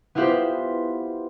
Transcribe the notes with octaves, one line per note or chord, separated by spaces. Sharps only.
B3 E4 F4 G4 B4 C5